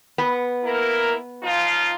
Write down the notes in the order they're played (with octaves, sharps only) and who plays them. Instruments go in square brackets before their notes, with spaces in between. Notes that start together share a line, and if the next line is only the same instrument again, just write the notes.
[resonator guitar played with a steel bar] B3
[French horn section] A#3 E4 A#4
F3 D#4 F4